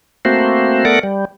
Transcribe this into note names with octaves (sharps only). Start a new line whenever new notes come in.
A3 A#3 C4 F#4 C5
A3 B3 A4 A#4 D5 F#5
G3